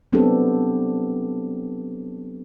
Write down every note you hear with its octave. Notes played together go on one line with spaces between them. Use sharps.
F#3 B3 C4 D4 G4 A4